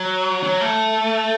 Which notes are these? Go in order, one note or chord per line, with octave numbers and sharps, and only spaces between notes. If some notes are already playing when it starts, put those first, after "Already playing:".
Already playing: F#3
F#3
A3